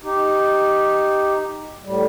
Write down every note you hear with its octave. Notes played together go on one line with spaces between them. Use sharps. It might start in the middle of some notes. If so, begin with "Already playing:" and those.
D#4 G4
A2 G3